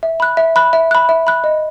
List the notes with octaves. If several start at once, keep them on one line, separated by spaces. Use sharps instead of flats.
E5
B5 F#6
E5
B5 F#6
E5
B5 F#6
E5
B5 F#6
D#5